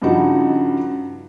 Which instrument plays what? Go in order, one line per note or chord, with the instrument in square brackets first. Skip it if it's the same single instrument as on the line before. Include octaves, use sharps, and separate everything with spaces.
[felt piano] G2 C#3 F3 D#4 F#4